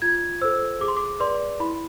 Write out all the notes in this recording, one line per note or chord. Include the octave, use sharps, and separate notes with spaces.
F4 G#6
A4 C5 E6
G#4 D6
C6
D6
B4 D5 C6
E4 B5